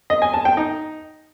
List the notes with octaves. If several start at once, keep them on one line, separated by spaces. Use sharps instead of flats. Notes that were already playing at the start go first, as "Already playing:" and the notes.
D#5
G#5
A5
G5
D#4